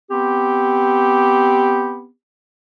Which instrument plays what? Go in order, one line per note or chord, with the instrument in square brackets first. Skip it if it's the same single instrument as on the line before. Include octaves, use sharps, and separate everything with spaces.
[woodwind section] B3 C4 G4